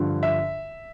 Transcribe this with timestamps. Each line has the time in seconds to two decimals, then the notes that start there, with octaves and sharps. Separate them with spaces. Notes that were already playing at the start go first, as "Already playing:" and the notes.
Already playing: G2 D3 F3
0.23 E5